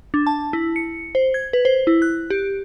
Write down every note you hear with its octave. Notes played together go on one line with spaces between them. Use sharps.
D4
A5
E4
C#7
C5
G#6
B4
C5
E4
F#6
G4